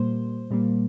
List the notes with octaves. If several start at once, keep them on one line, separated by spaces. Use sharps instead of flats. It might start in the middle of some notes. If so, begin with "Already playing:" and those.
Already playing: A#2 G3 A#3 C5
A#2 G3 A#3